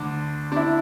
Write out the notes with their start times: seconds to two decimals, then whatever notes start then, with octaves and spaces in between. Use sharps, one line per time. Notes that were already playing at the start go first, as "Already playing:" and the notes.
Already playing: D2 D3 D4
0.52 D4
0.56 E4